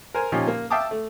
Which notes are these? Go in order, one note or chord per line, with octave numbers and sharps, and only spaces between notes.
A#4 C5 G#5
A#2 F3 C#4 D#4 G4
A#3
E5 F5 G5 A5 D6 D#6
A3